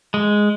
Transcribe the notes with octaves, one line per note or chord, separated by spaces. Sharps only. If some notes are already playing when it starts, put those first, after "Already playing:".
G#3